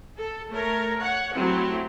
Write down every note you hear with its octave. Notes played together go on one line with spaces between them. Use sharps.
A4
A3 A#4 C#5
C#5 F#5
F#3 A3 C4 E4 G4